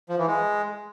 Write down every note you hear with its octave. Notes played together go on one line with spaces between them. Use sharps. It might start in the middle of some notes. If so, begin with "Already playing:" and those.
F3
E3
G#3